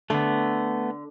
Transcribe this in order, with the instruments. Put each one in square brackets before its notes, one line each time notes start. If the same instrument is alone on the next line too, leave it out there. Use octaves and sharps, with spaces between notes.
[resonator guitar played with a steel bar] D3 [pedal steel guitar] A3 B3